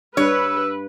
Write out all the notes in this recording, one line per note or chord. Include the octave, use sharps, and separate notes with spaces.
G2 B4 C#5 E6